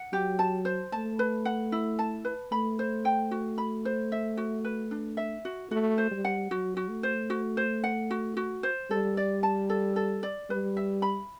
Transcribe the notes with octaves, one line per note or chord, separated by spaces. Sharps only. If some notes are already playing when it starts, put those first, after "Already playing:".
Already playing: F#5
F#3 G4
A5
C5
A3 A5
B4
F#5
E4
A5
B4
A3 B5
C5
G5
F#4
B5
C5
E5
F#4
B4
D4
E5
F#4
A3 F#4
C5
G3
F#5
F#3 F#4
F#4
A3
C5
F#4
C5
F#5
F#4
F#4
C5
G3 A4
D5
A5
A4
A4
D5
G3 B4
E5
B5